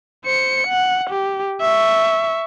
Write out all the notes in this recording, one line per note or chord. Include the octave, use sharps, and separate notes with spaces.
C5 C#7
F#5
G4
E5 C#6